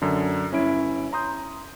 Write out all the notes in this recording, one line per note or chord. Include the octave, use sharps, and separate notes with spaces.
F#2 D3
G1 C#4 E4 D7
A#5 C6 D#6 G6